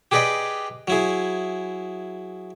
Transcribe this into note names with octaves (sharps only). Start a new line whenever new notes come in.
G4 G#4 B4 D5 D#5 G5
F#3 E4 G#4